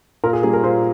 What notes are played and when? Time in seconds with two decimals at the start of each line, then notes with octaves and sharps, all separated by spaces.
0.24 A#2 A#4
0.33 G#4
0.43 G3 A#3 G#4
0.53 A#4
0.63 A#2 C5